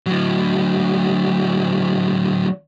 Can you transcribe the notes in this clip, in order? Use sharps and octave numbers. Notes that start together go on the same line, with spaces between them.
D2 F#3